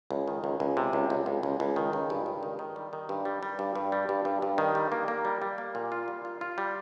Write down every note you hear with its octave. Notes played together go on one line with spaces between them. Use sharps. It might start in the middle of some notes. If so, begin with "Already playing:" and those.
C#2
D#3
C#2
C#2
C3
C#2
C#2
C#2
C#2
C#2
D#3
C#2
G2
G2
D#3
D#3
G3
D#3
G2
G3
G3
G2
G2
G3
G2
G2
G2
D#3
G3
A#3
A#3
G3
G3
A#3
A#2
F4
G3
F4
F4
G3